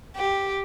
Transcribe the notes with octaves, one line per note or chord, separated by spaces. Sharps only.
G4